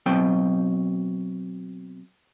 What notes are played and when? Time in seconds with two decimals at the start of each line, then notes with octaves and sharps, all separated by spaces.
0.06 B2 F#3 C4 G5